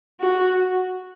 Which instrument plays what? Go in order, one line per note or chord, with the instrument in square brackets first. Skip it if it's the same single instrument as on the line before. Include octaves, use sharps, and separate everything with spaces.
[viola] F#4